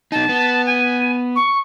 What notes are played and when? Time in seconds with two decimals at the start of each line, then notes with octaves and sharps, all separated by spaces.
0.12 B2 D#4 A5
0.29 B3
0.66 G#5
1.36 C#6